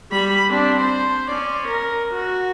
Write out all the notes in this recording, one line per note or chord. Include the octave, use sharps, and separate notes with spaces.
G3 B5
C4 D4
C5
C#4 D5
A#4
F#4